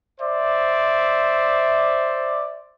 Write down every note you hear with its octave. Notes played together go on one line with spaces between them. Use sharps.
C5 D5 E5